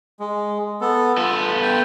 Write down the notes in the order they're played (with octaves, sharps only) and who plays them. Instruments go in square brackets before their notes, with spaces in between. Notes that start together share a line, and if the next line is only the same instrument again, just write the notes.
[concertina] G#3
B3 A4
[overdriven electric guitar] B3 A4 [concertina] F4
[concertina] G5